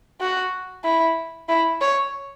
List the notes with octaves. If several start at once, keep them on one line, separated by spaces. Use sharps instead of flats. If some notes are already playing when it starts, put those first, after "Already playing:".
F#4
E4
E4
C#5